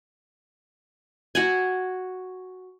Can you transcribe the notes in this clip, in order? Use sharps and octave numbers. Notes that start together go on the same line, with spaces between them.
F#4 F#5 G#5